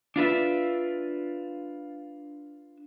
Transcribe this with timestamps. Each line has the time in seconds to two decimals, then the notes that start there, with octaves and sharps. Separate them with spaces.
0.16 D4 F4 B4 E5